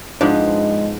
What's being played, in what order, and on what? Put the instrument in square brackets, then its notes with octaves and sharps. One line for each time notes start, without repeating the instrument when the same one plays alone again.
[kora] G#2 F3 B3 [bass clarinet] G#3 [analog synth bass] D4